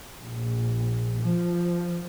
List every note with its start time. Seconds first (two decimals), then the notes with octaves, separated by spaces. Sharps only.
0.20 A#1
1.23 F3